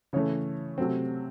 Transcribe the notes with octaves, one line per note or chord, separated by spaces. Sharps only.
C#3 E3 A3 C#5
C3 F#3 A3 C4